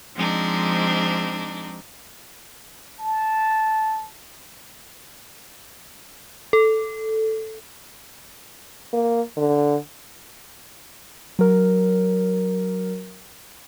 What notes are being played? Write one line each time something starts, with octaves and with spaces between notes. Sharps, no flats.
F3 G#3 C4 D4 D#4
A5
A4
A#3
D3
F#3 A#4